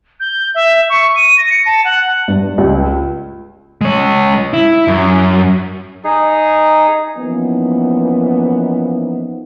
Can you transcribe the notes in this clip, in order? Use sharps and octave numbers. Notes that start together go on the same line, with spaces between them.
G6
E5
C#6
D#7
A#6
C#7
A5
F#5
G2
C#2
G#3 C#5
E4
F#2
D#4 G#4
E3 F3 A#3 B3 C#4 D#4